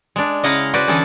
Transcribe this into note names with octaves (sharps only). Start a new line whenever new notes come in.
G#3 D4
C#3 E4 D#5 F5 F#5 A#5
F#4 B4 C5 D5
D3 E3 C#4 G#4 A4 A5